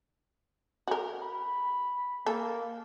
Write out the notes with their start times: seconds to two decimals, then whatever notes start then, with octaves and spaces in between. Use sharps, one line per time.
0.88 F#4 A#4
1.22 B5
2.26 A#3 A4